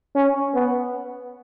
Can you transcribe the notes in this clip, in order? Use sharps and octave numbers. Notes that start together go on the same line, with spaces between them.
C#4
B3